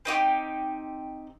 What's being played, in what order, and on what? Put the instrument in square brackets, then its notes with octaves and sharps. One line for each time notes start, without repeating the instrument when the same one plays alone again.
[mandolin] C4 D#4 F#4 G4